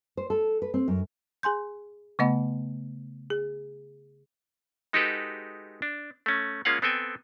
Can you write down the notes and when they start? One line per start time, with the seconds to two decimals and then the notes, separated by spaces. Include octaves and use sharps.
0.17 C5
0.30 A4
0.62 B4
0.74 C4
0.88 F#2
1.43 G#4 G#5 C6 G6
2.19 C#3 A3 B3 D#5 F#5 B5
3.30 G#4
4.93 G#3 D#4 F#4 G4 A4 B4
5.82 D4
6.26 A3 C#4
6.65 G#3 A#3 C#4 F4 F5 F#5
6.82 B3 C4 A4 G5 G#5